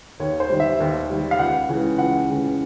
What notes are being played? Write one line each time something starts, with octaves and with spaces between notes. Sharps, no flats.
D#2 C#5
C5
D#3 G3
E5
D#2
D#3 G3
F5
C#2 F#5
C#3 E3 G#3
C#2 F#5
C#3 E3 G#3